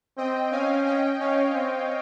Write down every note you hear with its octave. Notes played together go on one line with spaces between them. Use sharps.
C4 D#5 G5
C#4 F5 G#5
D#5 G5
C#4 C#5 F5
C4